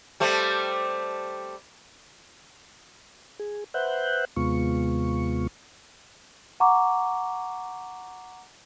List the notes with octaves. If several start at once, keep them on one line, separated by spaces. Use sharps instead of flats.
G3 A3 C4
G#4
B4 C5 E5 F#5 F#6 G6
D#2 C3 G#3 B3 F4 C#6
F#5 A#5 C#6 D6